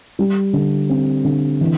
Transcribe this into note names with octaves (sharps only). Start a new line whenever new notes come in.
G3
D3
C4
D3
E3